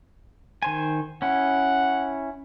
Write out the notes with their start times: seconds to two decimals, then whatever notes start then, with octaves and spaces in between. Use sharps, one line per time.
0.62 D#3 C5 G#5
1.22 C#4 E4 F#5